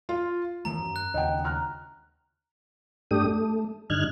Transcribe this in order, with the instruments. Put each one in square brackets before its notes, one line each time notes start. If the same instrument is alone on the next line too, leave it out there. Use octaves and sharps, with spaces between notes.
[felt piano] F4
[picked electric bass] D#3 E3 A3 [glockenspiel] A#5
[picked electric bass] F#2
[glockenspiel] F#6
[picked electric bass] D#2 C#3 [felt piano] D#5 F#5 G5
[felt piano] A#5 F6 F#6
[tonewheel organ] G2 A3 D4 G4 D#6
A3
G2 D3 D#4 F6 F#6 G#6